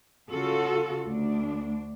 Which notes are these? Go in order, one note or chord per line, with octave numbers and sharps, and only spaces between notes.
C#3 F4 F#4 A4
D2 D4